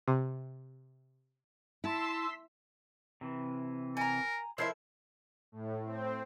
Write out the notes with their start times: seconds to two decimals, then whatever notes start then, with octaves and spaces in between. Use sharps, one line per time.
0.08 C3
1.84 E4 A5 C6 E6 B6
3.21 C3 E3
3.97 A#4 G#5 A#5
4.58 F3 E4 A4 A#4 C#5 E5 C6
5.52 A2
5.85 C4